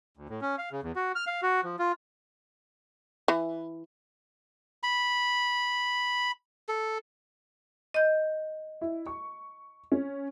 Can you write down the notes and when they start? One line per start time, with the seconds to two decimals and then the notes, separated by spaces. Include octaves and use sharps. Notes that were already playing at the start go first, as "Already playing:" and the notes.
0.17 D2
0.29 A2
0.41 C#4
0.58 F5
0.72 C#3
0.83 E2
0.96 F#4
1.15 F6
1.27 F5
1.42 F#4
1.64 F3
1.79 F4
3.28 E3
4.83 B5
6.69 A4
7.94 D#5 G6
8.81 E4
9.07 C#6
9.92 C#4